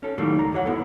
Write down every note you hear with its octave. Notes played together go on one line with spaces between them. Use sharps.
C#4 A4
D#3 E3 F#3 G3 A3 A#3
C#2 A#5
F#2 E3 G#4 C#5 F#5
B3 E4 A4